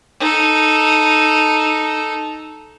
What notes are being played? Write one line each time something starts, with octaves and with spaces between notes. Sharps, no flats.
D#4 A4